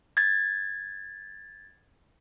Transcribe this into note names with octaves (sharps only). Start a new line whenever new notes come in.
G#6 A6